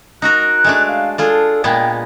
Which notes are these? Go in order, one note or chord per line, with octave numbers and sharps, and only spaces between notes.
D#4 F#4 A#4 F#6
G#3 A3 D4
F5
D4 F4 G#4 A4
A#2 G#3 B3 G5